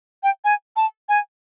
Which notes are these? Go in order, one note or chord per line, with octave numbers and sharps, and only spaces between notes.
G5
G#5
A5
G#5